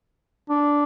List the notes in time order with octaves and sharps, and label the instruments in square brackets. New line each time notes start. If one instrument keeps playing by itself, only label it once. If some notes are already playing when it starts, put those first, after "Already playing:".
[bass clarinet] D4